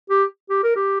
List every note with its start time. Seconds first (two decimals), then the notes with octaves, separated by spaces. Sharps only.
0.10 G4
0.50 G4
0.64 A#4
0.76 G4